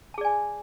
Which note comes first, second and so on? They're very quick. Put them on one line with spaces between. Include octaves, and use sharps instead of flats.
A5 G#4 D5 G#5